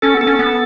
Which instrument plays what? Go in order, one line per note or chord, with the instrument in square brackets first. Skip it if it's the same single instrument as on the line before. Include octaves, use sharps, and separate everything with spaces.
[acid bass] C#4 [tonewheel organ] A4
[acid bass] B3
[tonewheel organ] A4
[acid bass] C#4
B3